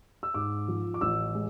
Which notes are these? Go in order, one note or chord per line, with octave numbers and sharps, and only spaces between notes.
E6
G#2 D6
F3
D6
A1 E6
G#3